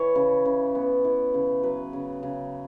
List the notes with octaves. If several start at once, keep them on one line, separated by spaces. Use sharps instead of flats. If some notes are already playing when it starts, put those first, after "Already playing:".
Already playing: E3 C#5
C#3
C#3
B3
E3
C#3
F#3 B4
C#3
C#3